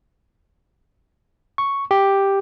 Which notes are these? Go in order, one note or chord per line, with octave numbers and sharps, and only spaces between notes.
C#6
G4